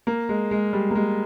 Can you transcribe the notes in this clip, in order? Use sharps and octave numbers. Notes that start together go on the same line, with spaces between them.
A#3
G#3
G#3
G3
A#3
G#3